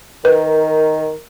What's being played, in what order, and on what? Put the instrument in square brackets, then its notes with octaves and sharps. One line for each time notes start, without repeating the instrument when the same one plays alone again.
[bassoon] D#3 [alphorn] A#4 [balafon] B4